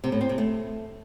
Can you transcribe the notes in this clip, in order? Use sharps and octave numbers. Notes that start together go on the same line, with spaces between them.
C3
A2
C4
C3
A3